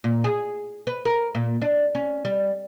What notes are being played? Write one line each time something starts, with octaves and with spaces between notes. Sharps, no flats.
A#2
G#4
B4
A#4
A#2
D4
C#4
G3